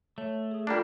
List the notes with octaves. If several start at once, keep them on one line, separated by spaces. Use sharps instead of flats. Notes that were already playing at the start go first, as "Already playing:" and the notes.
A3 C#5
G#4 D#6
G3 A#3 D4 F4 A4